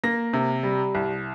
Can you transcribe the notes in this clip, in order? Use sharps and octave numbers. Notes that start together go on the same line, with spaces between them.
A#3 A#6
C3
G3
C2